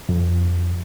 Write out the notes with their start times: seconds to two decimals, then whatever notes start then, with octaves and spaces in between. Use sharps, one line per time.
0.09 F2